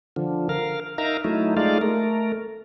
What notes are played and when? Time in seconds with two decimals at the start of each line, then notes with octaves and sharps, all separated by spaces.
0.16 D3 F3
0.49 A#4 F5
0.98 D#4 A#4 E5 F5 A#5
1.24 F#3 A3 D#4 E4
1.57 G#3 A3 D#4 F4 D5 F5
1.81 A3 A#4